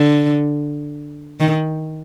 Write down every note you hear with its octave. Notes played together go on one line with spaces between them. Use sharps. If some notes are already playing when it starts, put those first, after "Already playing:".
Already playing: D3
D#3